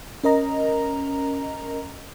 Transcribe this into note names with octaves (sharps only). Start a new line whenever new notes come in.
C#4 A#4 D#5 A#5